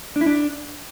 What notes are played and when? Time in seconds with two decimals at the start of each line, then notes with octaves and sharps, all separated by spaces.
0.16 D4
0.21 E4
0.26 D4